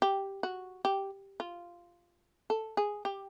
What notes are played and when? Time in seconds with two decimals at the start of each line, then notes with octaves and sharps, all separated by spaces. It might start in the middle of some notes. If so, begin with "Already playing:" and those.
0.02 G4
0.43 F#4
0.85 G4
1.40 F4
2.50 A4
2.77 G#4
3.05 G4